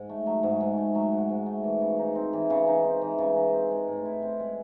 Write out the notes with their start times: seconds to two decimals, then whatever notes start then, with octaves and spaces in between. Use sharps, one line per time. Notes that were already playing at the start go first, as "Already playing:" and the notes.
Already playing: G#2
0.09 A3
0.26 F#3
0.43 G#2
0.61 G#2
0.78 A3
0.95 F#3
1.12 G#2
1.29 G#2
1.46 A3
1.64 E3
1.81 C#3
1.99 D#4
2.15 C4
2.33 E3
2.50 C#3
2.67 D#4
2.84 C4
3.02 E3
3.18 C#3
3.36 D#4
3.53 C4
3.71 G#3
3.87 A2
4.05 E4
4.22 C4
4.40 G#3